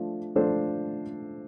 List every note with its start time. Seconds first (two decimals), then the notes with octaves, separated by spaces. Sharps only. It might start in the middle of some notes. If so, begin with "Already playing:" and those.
Already playing: F3 A3 D4
0.36 F3 A3 D4 A4 C5